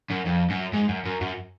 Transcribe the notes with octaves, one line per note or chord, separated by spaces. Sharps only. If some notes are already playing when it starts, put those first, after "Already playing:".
F#2
F2
F#2
G#2
F#2
F#2
F#2